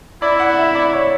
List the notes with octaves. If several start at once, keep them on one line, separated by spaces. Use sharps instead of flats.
E4 D5
F#5
E5
D5
C#5